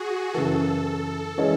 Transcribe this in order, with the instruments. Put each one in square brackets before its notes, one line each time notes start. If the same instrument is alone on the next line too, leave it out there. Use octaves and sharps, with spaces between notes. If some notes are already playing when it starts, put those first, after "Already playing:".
Already playing: [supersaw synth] F#4 G#4
[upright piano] F#2 C#3 E3 [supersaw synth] A4
[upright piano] E3 G#3 C#4 G#4 D#5